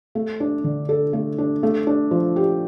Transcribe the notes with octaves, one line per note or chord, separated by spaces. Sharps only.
A3
D4
D3
A4
A3
D4
A3
D4
F3
G4